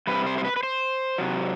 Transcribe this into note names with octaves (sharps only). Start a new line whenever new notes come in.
C3 G3 B4
C5
C5
B4
B4
C5
C3 F#3